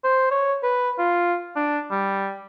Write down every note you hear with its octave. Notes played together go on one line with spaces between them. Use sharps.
C5
C#5
B4
F4
D4
G3